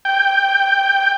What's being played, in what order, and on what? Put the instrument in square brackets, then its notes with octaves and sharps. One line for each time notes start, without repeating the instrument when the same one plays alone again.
[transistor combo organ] G5